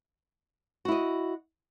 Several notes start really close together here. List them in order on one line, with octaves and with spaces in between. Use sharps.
F#4 E4 D#5